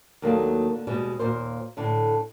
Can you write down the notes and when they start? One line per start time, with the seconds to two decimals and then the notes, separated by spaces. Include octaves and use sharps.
0.22 D#2 D#3 F#3 A3 A#3 D4
0.72 D3
0.87 D#2 B2 G3 G#3
1.19 D#2 A#2 A#4 C5
1.77 A2 D3 A3